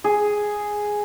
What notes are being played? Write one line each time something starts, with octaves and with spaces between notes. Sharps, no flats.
G#4